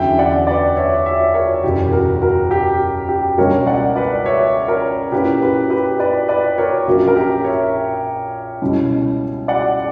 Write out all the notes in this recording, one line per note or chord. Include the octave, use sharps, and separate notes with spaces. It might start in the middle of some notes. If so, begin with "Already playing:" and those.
Already playing: E2 D3 F#3 C#4 E5 G5
D5 F#5
B4 D5
C#5 E5
C#5 E5
A#4 C#5
F#1 E2 B2 F#3 C#4 G4
F#4 A#4
F#4 A#4
G4
G4
C#2 B2 G3 A#3 D4 A#4 C#5
D5 F#5
B4 D5
C#5 E5
A#4 C#5
A#2 A#3 C#4 E4 G4 B4
G4 B4
G4 B4
B4 D5
B4 D5
A#4 C#5
A#1 A#2 F#3 A#3 C#4 F#4
A#4
G4
C#5 E5
C#2 B2 G3 C#4 E4
D5 F#5